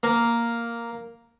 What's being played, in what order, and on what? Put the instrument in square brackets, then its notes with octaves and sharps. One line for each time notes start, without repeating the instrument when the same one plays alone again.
[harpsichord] A#3